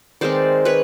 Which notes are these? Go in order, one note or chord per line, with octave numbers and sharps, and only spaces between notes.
D#3 G#3 C4 C5 D5
B4 C#5